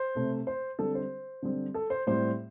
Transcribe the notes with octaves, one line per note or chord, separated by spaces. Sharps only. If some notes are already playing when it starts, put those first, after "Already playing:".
Already playing: C5
C3 A3 C4
C5
D3 G3 C4 A4
C5
D3 G3 C4
A4
C5
A2 G3 C4 C5